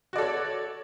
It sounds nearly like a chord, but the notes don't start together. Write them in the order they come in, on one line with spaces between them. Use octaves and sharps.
F#4 D5 A4 C#5